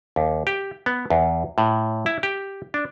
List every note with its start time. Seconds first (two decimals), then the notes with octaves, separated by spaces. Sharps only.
0.16 D#2
0.47 G4
0.86 B3
1.10 E2
1.58 A2
2.06 E4
2.23 G4
2.74 D4